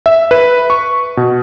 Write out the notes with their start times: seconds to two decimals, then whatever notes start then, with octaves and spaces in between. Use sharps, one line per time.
0.06 E5
0.31 B4
0.70 C#6
1.17 B2